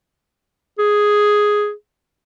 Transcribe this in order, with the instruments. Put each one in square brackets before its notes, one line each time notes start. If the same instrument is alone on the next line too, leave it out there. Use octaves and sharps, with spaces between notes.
[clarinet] G#4